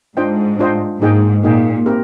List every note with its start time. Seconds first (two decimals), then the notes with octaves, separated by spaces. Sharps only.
0.16 G#2 D4 F4 C5 D#5 G5
0.59 D4 F4 C5 D#5 G5
1.01 G#2 A#3 D#4 G#4 D#5 G5
1.43 A#2 A#3 D#4 G#4 D#5 G5
1.86 C4 G4 A#4